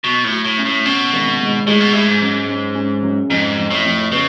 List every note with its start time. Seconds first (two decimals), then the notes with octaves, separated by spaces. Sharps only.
0.04 B2 F#3
0.24 A2
0.31 F#3
0.45 A2
0.58 C#4
0.65 A2
0.85 B2 C#4
1.13 G#1
1.40 G#2
1.67 A2 G#3
1.81 B2
1.93 A2 G#3
2.08 G#2
2.21 F#2
2.49 C#4
2.75 C#4
3.03 F#2
3.30 F2 G#2
3.57 F2
3.71 A2
3.85 F2
4.12 C#3 B3